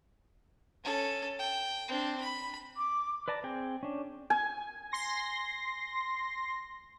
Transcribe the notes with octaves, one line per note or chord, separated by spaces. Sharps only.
C#4 A4
G5
C4 D4
B5
D6
B4 D5 A5 A#5
C4 G#4 G5
C#4 D4
G#5
C6 A#6